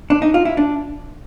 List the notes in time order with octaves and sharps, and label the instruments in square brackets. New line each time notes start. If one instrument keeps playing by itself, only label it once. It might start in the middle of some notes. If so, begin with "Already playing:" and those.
[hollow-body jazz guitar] D4
D#4
F4
E4
D4